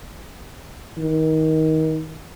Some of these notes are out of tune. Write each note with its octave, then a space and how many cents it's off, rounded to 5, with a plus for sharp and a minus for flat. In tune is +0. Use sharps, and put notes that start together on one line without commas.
D#3 +25